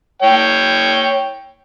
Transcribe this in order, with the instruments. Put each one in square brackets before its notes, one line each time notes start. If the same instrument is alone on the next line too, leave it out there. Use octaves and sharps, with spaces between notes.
[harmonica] C#5 G5